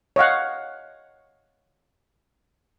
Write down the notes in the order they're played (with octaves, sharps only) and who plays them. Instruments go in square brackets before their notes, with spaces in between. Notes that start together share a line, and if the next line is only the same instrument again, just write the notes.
[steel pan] C#5 D#5 F5 F#5